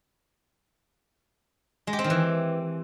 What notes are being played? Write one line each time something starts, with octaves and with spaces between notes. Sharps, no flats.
G#3
G4
C4
D#3
E3